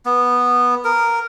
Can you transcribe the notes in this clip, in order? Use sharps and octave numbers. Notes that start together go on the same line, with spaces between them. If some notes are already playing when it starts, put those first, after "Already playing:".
B3
A#4